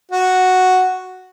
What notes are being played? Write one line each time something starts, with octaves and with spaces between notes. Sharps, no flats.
F#4